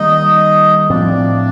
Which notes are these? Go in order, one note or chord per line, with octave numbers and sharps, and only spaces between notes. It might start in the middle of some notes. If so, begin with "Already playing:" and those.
Already playing: D#3 G3 A#3 D#4 D#5
A2 F3 C4 D4 D5